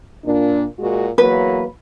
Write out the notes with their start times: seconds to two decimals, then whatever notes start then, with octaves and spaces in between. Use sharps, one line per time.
0.25 A#2 D4
0.79 A#2 G#3 F#4
1.18 E2 F#3 A#3 B4